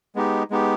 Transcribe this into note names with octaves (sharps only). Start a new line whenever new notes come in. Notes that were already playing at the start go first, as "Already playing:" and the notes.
G#3 B3 D#4 G4
G#3 B3 D#4 G4